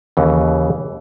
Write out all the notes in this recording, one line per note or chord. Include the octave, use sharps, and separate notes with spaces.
D#2 C#3 E3